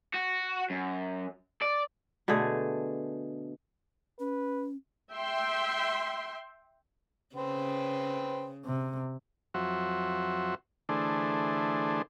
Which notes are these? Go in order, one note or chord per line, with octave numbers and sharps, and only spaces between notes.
F#4
F#2
D5
B2 D3 A3 G#4
C#4 B4
E5 G5 C6
C#3 B4 C5 G5
C3
F2 F#3 F#4 C5 E5
D3 E3 A3 D4 G#4 C5